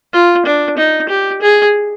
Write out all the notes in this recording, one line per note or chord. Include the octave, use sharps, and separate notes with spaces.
F4
D4
D#4
G4
G#4